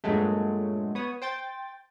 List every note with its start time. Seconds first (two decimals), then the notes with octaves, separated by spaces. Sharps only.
0.04 G2 A#2 F#3 G#3 A3
0.95 B3 C#5 D#6
1.22 C5 G5 A6